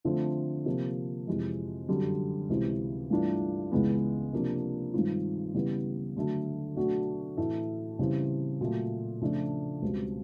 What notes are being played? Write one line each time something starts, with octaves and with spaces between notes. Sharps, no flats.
D3 F3 A3 C4 F4
C3 F3 A#3
F2 C3 E3 G#3
F#2 D3 G3
C#2 C3 E3
G2 E3 A3 D4 F4
C#2 C#3 E3 G#3 B3
C3 F3 A#3 D4
G2 D#3 G#3 C4 F4
C#3 E3 G3 B3
D3 F#3 A3
B2 F#3 A3 D4 F#4
A2 E3 A3
C#3 E3 G3 C4
A#2 F#3 A3
C#3 F3 A3 D4 F4
C#2 B2 G3 C4